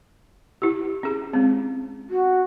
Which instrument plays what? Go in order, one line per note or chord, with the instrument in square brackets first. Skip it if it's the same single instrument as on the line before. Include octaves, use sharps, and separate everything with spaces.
[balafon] E4 G4
C#4 G#4
G#3 C4
[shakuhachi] F#4